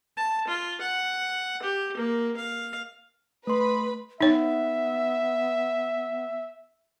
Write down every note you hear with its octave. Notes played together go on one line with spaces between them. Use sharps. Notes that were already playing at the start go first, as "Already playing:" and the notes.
A5
F4
F#5
G4
A#3
F5
A3 B4 B5 C6
B3 D#4 C#5 E5